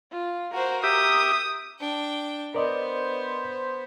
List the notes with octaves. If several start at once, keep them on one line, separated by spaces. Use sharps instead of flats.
F4
F#4 A#4 C5
G4 E5 D#6
D4 G5
B3 A#4 C5 D5 D#5